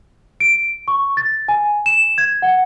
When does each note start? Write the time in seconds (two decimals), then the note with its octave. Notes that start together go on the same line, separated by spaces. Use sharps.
0.40 D7
0.88 C#6
1.17 A6
1.48 G#5
1.86 E7
2.18 G#6
2.42 F#5